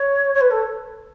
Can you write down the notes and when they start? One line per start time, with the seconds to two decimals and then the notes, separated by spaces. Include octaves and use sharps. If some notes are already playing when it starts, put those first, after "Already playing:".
Already playing: C#5
0.34 C#5
0.40 B4
0.50 A4